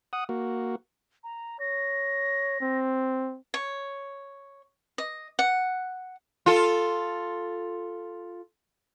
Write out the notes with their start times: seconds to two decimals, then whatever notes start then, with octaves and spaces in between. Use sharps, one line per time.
0.13 F#5 D#6
0.29 A#3 F#4
1.24 A#5
1.60 C#5 A#6
2.61 C4
3.54 C#5
4.98 D#5
5.39 F#5
6.46 F4 A4